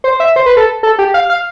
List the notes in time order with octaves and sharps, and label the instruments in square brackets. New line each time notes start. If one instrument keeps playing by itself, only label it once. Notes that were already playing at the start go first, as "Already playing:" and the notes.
[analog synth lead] C5
E5
C5
B4
A4
A4
G4
F5
F5